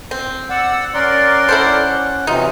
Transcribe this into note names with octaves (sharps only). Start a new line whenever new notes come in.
C4
D5 F#5 E6
C#4 A#4 D5 F#5 C6
E4 A4 C5
C3 E3 F#3 D#4 F4